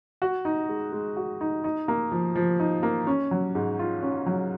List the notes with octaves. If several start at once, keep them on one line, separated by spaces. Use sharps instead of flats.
F#4
D#4
G#3
G#3
F#4
D#4
D#4
A#3
F3
F3
D#4
A#3
C#4
F#3
G#2
F4
C#4
F#3